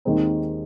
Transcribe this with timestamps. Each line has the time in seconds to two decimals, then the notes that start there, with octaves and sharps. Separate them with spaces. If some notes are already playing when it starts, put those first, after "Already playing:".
0.05 D#2 D#3 G#3 C4 D#4